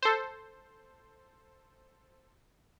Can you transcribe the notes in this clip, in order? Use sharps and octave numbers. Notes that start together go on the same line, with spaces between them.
A4 C5